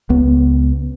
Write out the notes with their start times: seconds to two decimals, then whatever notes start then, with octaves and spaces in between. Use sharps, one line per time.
0.10 C#2 B3